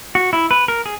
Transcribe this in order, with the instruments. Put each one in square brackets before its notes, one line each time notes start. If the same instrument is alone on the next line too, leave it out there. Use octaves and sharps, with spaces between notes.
[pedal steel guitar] F#4
E4
B4
A#4
G#4